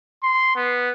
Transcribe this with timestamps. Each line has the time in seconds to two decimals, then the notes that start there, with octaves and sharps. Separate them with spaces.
0.23 C6
0.56 B3